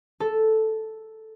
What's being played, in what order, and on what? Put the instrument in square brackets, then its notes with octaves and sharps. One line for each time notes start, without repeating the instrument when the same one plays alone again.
[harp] A4